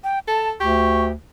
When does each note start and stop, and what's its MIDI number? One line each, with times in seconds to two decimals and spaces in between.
0.04 0.19 79
0.28 0.55 69
0.28 0.49 81
0.60 1.13 38
0.60 1.09 67
0.60 1.03 85